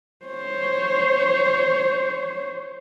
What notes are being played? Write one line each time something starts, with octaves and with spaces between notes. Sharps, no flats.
C5 C#5